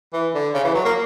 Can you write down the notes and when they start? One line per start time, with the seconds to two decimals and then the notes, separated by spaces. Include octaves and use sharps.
0.14 E3
0.35 D3
0.55 C#3
0.65 E3
0.75 F#3
0.85 A#3